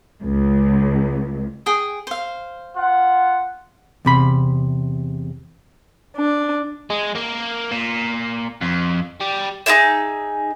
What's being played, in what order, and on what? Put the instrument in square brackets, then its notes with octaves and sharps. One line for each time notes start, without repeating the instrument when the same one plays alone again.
[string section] C#2
[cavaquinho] G#4 G5 D#6
C5 F5
[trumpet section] F4 F#5
[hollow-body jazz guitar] E2 C3 B5
[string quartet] D4
[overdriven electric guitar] G#3
A#3
A#2
F2
G3
[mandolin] D#4 F4 G#4 E5